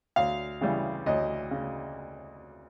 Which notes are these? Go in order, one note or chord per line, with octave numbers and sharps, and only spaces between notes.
D2 F5
C#3 E3 G3
D2 D#5
C#3